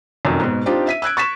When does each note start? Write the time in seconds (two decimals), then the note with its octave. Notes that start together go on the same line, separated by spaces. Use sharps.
0.25 F1 F#2 D#3
0.40 G#2 B2
0.66 C4 D4 D#4 F4 G4
0.87 E5 B6 D#7
1.02 E6 F#6 G#6 D7
1.17 C#6 A6 B6 E7